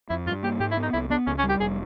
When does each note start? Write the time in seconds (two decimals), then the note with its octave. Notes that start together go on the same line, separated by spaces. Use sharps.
0.10 F2 E4
0.26 G2 F4
0.43 A#3 G4
0.60 G#2 G4
0.71 E4
0.77 B3
0.82 D#4
0.93 C2 E4
1.10 B3 D4
1.27 C#2 C#4
1.38 C#4
1.44 G3
1.49 G4
1.60 F1 G#4